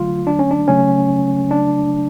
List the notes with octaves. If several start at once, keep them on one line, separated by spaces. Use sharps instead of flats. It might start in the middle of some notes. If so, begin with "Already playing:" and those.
Already playing: D3 F#3 A3 F4
D4
C#4
D4
C#3 F#3 A3 C#4
D4